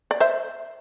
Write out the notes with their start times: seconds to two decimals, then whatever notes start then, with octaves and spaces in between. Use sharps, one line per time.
0.11 D5
0.20 C5 E5